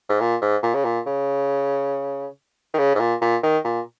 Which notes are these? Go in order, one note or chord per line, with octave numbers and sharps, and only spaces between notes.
G#2
A#2
G#2
A#2
C#3
A#2
C#3
D#3
C#3
G#2
A#2
A#2
D#3
A#2